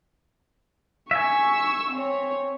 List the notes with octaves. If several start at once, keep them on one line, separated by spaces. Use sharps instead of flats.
E5 G#5 C#6 E6
C4 C#5